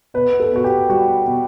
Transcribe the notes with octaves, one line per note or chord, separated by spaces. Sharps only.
B2 B4
A4
B2 F#4
G4
G3 F#4
B2